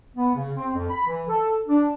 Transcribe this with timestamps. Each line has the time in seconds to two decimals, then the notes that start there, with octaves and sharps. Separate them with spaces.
0.17 B3
0.35 C#3
0.57 C4
0.74 F2
0.89 B5
1.07 E3
1.28 A4
1.68 D4